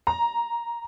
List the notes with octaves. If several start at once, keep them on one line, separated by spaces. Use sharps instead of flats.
A#5